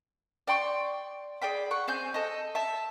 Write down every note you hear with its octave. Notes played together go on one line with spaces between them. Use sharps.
D5 G5 C6 C#6
G#4 D5 G5 B5
F#5 C#6
C4 G#5 G6
A4 D#5
E5 A5